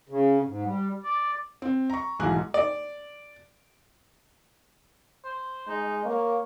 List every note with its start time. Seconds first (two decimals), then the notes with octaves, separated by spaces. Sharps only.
0.09 C#3
0.46 G#2
0.64 G3
1.04 D5
1.62 C4
1.90 A#5 C#6
2.20 B1 G#2 E3 G#5 A#5 F#6
2.54 D5
5.25 C5
5.68 G#3 D#4
6.05 A#3 C#5